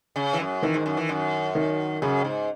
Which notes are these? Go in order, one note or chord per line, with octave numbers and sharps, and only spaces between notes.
C#3
E3
F#2
D#3 E3
G#2
F#2
E3
F#2
D#3
F#2 C#3
G#2